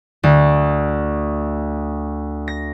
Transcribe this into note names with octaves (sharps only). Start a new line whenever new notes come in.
D2
A#6